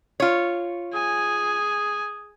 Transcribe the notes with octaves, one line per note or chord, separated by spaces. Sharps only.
F4 C#5
G#4 G#5